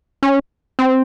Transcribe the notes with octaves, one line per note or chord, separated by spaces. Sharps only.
C#4
C4